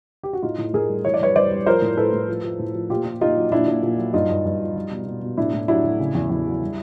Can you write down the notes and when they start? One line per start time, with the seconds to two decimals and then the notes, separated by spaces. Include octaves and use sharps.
0.23 G4
0.33 F#4
0.43 A2 D#4 F4
0.58 A2
0.74 A2 G#4 A#4
0.89 G3
1.05 E3 C#5
1.14 D5
1.21 G3 B4 C#5
1.36 G3 C5 D5
1.51 G3
1.66 F3 A#4 C5
1.82 A2
1.97 A2 A4 B4
2.13 A2
2.28 F3
2.44 F3
2.59 A2
2.75 F3
2.90 A#2 F4 G4
3.06 A#2
3.21 A#2 D#4 F4
3.36 F#3
3.52 A#2 D4 E4
3.67 A#2
3.83 A#2
3.98 F#3
4.14 G2 D#4 F4
4.29 G2
4.45 G2
4.60 F3
4.76 G3
4.91 B2
5.06 B2
5.22 B2
5.37 A2 D4 E4
5.53 A2
5.68 F#3 D4 E4
5.84 A2
6.00 C#3
6.15 E2
6.30 E2
6.46 F#3
6.61 G3